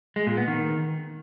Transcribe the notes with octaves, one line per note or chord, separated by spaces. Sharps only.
G#3
A#2
B3
D#3